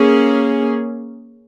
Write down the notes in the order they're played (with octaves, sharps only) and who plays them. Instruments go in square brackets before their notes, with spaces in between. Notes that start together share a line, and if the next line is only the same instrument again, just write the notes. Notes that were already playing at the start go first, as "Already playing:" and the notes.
Already playing: [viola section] A#3 C#4 G#4